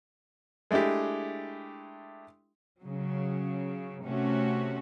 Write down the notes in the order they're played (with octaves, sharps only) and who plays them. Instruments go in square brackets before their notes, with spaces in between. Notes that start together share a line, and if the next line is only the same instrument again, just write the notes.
[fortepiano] G#3 A3 D4 E4 G4
[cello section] C#3 F#3
C3 A3 C#4 F#4